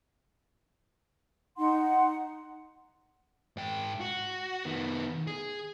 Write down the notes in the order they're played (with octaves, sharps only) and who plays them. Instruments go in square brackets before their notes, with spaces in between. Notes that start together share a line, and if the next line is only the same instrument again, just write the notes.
[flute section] D#4 F#5 C6
[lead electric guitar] G#2 G5
F#4
D#3 B3
G#4